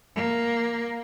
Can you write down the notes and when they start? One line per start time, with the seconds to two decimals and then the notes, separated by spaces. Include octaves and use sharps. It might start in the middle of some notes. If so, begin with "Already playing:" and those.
0.16 A#3